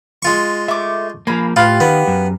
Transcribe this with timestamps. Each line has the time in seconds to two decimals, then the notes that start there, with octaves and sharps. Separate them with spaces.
0.22 G#3 F4 C#6
0.68 A3 E5 D6
1.27 F3 A#3 G#4 F5 B5
1.56 A2 F4 G4 B4 F5
1.80 D#3 B3
2.07 F#2